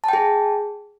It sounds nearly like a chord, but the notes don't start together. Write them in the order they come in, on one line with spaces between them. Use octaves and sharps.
A5 G5 G#4